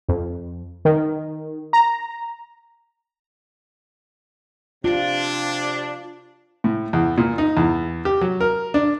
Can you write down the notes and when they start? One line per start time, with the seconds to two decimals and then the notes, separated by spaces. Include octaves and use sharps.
0.08 F2
0.85 D#3
1.73 A#5
4.84 C3 D4 F4
6.64 A2
6.93 E2
7.18 A#2
7.38 D#4
7.57 E2
8.05 G4
8.21 F#3
8.40 A#4
8.74 D4